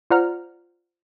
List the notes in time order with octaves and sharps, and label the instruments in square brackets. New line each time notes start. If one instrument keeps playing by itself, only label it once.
[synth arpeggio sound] F4 C5 D5 F#5 A#5 F6